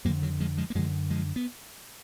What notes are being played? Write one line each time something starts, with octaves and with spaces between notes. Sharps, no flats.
F2 D3 F#3 A#3
D#3 F#3
F3 G#3
F3 G#3
A#3
F#2 D3 F3 G#3
F3 G#3
B3